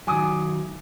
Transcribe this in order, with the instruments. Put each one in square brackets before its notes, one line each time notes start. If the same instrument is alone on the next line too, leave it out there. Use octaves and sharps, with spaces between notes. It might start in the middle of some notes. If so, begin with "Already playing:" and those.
[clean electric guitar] D#3 F#3 [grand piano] G#5 D6 D#6